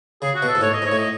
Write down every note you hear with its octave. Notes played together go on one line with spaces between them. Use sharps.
C#3 G#4
F#4
B2
A4
G#2
A2 C#5
D#5
G#2
C#5
A2
D#5